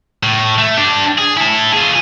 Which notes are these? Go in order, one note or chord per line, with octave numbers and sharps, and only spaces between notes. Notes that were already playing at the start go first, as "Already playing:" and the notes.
A2
A3
D4 G4
G#4
E4 A4
F4 G#4